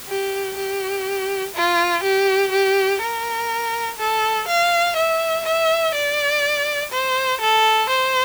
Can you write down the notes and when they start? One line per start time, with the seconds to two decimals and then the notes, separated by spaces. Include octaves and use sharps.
0.08 G4
0.56 G4
1.55 F4
2.03 G4
2.52 G4
3.01 A#4
3.98 A4
4.48 F5
4.96 E5
5.46 E5
5.95 D5
6.92 C5
7.41 A4
7.89 C5